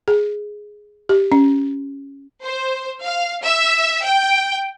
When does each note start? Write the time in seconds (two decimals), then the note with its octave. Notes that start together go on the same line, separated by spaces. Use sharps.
0.08 G#4
1.09 G4
1.32 C#4
2.43 C5
3.02 F5
3.44 E5
4.04 G5